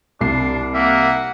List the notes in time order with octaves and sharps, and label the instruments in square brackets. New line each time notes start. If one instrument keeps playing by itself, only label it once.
[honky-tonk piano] C2 C7 [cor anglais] D4
[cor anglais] A#3 [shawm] E5 [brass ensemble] F#5